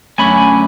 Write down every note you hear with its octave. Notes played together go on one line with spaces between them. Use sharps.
F#2 D3 A3 C#4 G#5 B5